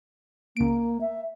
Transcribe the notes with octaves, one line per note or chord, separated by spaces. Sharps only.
C#2 A#3 D7
E5